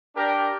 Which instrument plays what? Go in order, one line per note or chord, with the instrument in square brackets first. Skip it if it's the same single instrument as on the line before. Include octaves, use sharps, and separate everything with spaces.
[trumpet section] D4 G4 A#4 D5 G5